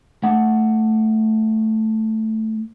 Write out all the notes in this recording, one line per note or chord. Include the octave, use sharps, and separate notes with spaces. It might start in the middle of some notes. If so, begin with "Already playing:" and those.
A3 F#5